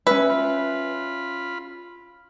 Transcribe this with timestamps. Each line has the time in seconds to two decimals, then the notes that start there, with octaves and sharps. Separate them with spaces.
0.07 C#4 B4 E5
0.30 F4 B5